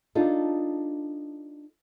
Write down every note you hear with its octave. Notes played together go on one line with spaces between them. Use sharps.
D4 D#4 F4 A4